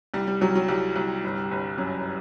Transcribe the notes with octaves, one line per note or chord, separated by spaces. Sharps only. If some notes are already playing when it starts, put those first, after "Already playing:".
C2 G3
G3
C2 F#3
F#3
C2 G3
C2
G1
G1
F#2